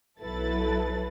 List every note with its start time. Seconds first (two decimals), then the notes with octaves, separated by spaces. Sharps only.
0.20 B1 F#3 E4 A4 B4 A6